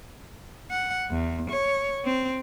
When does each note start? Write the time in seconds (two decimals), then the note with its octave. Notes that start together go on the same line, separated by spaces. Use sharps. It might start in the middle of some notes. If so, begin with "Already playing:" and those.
0.71 F#5
1.11 E2
1.50 C#5
2.05 C4